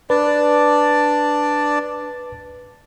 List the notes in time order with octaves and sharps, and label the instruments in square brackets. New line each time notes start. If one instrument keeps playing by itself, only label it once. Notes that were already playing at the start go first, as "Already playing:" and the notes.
[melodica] D4 D5 A5 [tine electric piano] B4